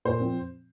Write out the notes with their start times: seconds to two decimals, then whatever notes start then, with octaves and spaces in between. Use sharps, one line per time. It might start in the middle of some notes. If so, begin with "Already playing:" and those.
0.05 A#2 C5
0.20 F3 C4